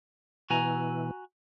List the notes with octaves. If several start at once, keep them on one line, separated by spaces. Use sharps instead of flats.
B2 E3 F#4 G#5 A#5